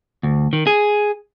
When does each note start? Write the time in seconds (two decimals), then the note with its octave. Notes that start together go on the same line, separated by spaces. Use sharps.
0.23 D2
0.53 D#3
0.67 G#4